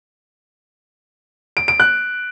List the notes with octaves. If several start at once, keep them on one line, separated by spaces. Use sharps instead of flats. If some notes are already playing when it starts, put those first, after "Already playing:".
D7
D7
F#6